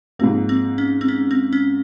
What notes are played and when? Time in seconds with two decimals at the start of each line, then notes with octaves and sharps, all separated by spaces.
0.19 G#2 F3 A#3 C4
0.49 C4
0.78 C#4
1.01 C4
1.08 C#4
1.31 C4
1.53 C#4